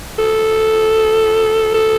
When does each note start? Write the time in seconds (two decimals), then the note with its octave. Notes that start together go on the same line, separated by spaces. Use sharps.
0.19 A4
1.75 A4